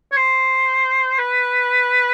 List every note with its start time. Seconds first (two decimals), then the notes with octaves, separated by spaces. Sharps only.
0.12 C#5
0.17 C5
1.18 B4